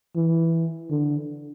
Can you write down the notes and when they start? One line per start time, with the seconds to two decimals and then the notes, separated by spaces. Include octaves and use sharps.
0.16 E3
0.90 D3